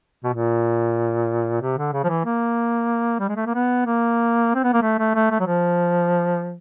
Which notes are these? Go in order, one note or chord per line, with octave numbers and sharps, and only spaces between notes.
B2
A#2
C3
D3
C#3
F3
E3
A#3
G3
G#3
A3
A#3
B3
A#3
C4
B3
A#3
A3
A3
A3
A3
F#3
F3